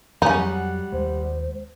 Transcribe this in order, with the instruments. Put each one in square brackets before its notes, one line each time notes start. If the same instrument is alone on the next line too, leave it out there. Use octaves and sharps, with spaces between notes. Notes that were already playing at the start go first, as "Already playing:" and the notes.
[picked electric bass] F2 F#3 [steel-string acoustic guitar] G3 F#5 [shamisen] C#4 D#4
[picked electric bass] D#2 G#3 [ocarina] C5